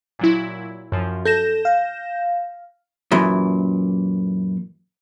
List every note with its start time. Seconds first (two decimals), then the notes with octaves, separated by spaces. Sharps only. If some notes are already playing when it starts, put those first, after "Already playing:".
0.19 A#2 F#3 E4
0.92 F#2 F3
1.25 A4 G6 A#6 E7
1.65 F5
3.11 F#2 A#2 E3